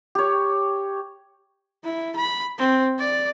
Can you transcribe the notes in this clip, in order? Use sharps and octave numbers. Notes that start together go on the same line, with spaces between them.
G4 C#5
E4
B5
C4
D5